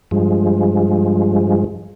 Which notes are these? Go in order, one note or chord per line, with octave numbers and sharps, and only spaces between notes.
G2 F3 G#3